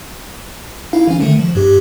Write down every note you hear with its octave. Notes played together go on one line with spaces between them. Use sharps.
D#4 E4 F5
E3 C#4
D3 D#3 A3
F3
G2 G4